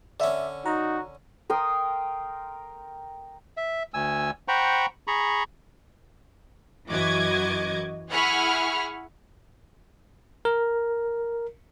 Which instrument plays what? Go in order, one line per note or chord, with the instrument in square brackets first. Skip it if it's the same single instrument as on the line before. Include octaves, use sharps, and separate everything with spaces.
[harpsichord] D3 C#4 [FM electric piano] D5 E5
[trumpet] D#4 [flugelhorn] F#4 [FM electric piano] A#5
[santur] A#4 G5 C6 D#6
[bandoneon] E5
D2 G#5 E6
C5 F#5 G5 A#5 B5 C#6
G#4 A#5 B5 C#6
[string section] F#2 E3 F#4 D#5 D6 G#6
E4 G#4 F#5 B5 C#6 F6
[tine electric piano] A#4